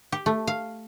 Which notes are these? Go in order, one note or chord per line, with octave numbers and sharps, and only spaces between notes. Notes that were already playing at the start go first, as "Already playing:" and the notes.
G4
A3
F5